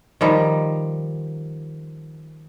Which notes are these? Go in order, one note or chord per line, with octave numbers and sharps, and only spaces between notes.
D#3 F3 G3